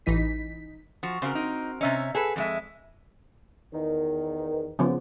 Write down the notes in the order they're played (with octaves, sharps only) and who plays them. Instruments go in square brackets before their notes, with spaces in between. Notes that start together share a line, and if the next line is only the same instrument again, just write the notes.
[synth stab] A1 E3 D#4 B6
[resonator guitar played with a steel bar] F3 F#4
[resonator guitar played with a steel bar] C#3 [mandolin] C4 F#4 A#4
[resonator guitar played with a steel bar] D#4
[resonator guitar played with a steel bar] C3 C#4 [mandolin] D#4 E5
[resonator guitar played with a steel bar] G#4 A4 B4 [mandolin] F#5
[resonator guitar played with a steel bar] F2 G#3 E5
[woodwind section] E2 D#3
[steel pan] C#3 F3 B3